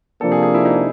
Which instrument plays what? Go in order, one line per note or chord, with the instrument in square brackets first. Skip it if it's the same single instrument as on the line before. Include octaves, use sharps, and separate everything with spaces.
[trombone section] C3 F3 A#3 D4 [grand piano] A4
[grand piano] G#4
G#4
E4
D#4